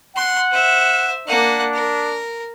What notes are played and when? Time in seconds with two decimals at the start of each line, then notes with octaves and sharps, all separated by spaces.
0.16 F#5 C6
0.52 C5 E5
1.27 A#3 D4 F#5
1.74 A#4